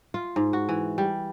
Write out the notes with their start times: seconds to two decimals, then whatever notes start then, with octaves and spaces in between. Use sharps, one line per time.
0.14 F4
0.36 G#2
0.53 F#4
0.69 E3
0.98 G3